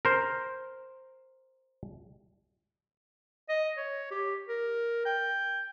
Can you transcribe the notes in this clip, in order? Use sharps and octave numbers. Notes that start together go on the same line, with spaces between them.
A#4 C5
D#5
C#5
G4
A#4
G5